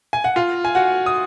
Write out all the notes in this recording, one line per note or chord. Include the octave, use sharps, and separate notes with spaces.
G#5
F#5
F4 F5
G#5
F#4 F#5
D#6